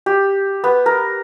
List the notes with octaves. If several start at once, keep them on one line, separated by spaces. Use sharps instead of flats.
G4
B3
A#4